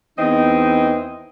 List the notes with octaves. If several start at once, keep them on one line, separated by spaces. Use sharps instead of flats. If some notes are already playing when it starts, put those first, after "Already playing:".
E2 E3 C4 D#4 D#5